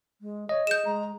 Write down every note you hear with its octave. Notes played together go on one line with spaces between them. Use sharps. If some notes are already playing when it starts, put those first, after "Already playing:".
G#3
C#5 D#5
G#4 G6 E7
G#3 A#5